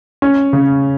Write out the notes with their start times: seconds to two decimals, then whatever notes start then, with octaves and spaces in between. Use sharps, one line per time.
0.22 C#4
0.53 C#3